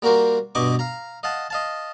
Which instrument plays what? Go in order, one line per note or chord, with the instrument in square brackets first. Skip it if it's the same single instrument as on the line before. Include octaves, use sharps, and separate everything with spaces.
[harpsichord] G3 A#3 F#4 A#4 C5
G2 B2 D#5 B5 C#6 D6
F5 A#5
D#5 F5 F#5 A5
D#5 F5 A5